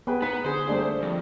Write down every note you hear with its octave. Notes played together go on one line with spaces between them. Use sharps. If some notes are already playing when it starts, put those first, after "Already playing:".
B3 G#4 B4 G5
B3 D#4 B4 B6
D3 G#4 C5
G3 A3 A#3 D4 G#4
F2